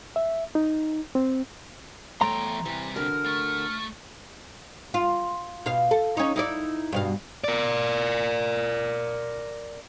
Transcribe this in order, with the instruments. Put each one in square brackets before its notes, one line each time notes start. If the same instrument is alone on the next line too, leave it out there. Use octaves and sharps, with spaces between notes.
[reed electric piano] E5
D#4
C4
[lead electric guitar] E2 G5 [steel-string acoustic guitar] A3 C#5 [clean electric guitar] A#5 C6
[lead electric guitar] C3 G3 [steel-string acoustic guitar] E3
[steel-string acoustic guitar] D3 F#4 A#4 [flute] F6
[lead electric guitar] A3 A4
[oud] F4
B2 F5
A4
C#4 D#4
D#4 E4 D5
G2 B2 F5
[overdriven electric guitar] A#4 D5